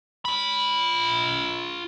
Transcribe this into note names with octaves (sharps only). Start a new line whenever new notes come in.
F4 B5